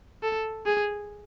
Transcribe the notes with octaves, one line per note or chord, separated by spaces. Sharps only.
A4
G#4